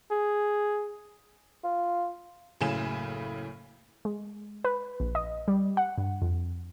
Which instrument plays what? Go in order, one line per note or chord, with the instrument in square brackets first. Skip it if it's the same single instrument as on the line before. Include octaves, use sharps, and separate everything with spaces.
[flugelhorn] G#4
[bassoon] F4
[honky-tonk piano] F#1 A2 C#3 G#5 E7
[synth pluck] G#3
B4
A#1
D#5
G3
F#5
G2
F2